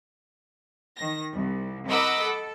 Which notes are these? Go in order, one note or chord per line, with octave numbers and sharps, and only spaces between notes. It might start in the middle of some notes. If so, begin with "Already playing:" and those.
D#3 A#6
C2
A#4 D#5 F#5 B5 D6 E6
A4